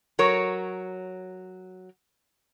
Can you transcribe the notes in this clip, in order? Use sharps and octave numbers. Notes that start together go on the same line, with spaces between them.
F#3 A#4 C#5